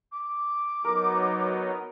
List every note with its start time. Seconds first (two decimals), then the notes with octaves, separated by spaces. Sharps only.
0.12 D6
0.85 F#3 B3 D#4 A#4